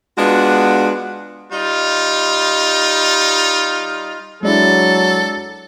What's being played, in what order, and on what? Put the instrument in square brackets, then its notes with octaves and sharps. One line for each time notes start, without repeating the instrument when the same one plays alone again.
[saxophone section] G#3 B3 D4 F4 F#4
[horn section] G3 D#4 F4
[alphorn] F#3 [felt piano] G#3 D4 E4 [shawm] A4